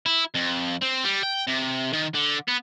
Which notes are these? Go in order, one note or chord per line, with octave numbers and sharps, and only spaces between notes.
E4
F2
C4
G3
G5
C3
D#3
D3
B3